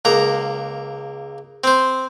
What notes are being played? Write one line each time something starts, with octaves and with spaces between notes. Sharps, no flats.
C#2 A#3 A#5
C4 C5